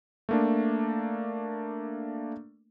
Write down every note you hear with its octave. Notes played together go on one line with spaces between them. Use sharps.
A3 A#3 D4